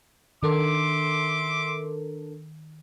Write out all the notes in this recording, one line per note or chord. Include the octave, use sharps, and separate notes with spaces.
D#3 D4 A4 A#4 E5 C6 D6